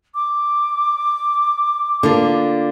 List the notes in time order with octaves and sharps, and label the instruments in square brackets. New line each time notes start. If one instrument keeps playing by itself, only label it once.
[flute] D6
[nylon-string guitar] D3 A#3 F4